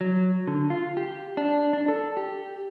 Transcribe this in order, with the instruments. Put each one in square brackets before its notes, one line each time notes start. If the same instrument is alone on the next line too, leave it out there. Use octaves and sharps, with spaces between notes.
[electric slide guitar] F#3
D3
F4
G4
D4
D4
A4
G4